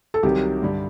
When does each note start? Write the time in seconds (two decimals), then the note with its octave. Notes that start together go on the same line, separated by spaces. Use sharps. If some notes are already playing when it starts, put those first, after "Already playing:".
0.14 A4
0.23 C2 C3 D#3 F#3 G4
0.62 G2 D3 G3